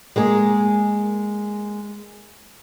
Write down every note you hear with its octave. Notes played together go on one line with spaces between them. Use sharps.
G#3 A#3 G#4